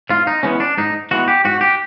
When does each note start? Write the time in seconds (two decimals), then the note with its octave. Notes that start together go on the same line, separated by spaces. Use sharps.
0.10 G#2 F4
0.27 D#4
0.43 E3 G#3 B3 C#4
0.60 D4
0.78 G#2 D#4
1.11 E3 G#3 B3 F#4
1.28 G4
1.45 G#2 F#4
1.61 G4